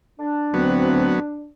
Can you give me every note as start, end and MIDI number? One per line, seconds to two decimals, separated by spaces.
0.19 1.49 62
0.54 1.15 38
0.54 1.20 54
0.54 1.20 59
0.54 1.15 60